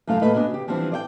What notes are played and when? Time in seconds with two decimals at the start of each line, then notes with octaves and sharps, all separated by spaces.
0.07 F#2 C#3 A3 E4 F5
0.22 A#2 A3 B4 D#5
0.34 B3 D4 F#4 D#5 G#5
0.50 C#3 G4
0.68 E3 F3 G3 B3 C4 D4
0.92 D5 D#5 G5